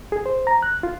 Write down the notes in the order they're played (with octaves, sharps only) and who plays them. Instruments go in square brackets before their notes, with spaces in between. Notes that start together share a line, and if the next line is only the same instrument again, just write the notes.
[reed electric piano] G#4
C5
A#5
F#6
F4